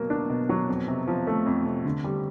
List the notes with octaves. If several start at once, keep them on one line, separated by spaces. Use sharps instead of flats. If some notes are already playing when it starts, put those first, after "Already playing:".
Already playing: B2 F#3 A#3
D4
B2
F#3
F2
C3
F3
A3
F2
C3
D3
G3